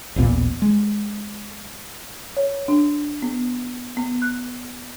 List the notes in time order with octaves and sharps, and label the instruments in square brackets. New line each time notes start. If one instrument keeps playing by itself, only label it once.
[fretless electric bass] A1 D#2 A#2 B3
G#3
[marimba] C#5
D4
B3
B3
F#6